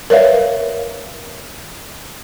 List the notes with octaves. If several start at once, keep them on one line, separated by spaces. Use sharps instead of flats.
A#4 B4 C#5 D5 E5 F5